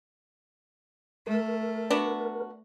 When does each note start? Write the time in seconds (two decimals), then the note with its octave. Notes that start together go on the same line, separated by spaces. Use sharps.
1.27 A3 A#4
1.90 B3 D4 F#4